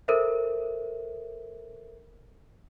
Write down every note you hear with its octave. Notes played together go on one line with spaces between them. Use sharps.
A4 A#4 C5 E5